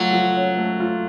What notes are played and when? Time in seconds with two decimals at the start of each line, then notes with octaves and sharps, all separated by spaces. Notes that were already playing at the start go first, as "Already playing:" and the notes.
Already playing: F#3 A3 F4
0.13 F3
0.36 C#4
0.57 A3
0.80 F4